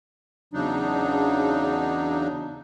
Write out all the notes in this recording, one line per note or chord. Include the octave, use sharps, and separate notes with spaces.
E2 C#3 F#3 D4 D#4